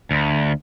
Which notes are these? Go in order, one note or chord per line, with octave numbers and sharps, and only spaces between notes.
D2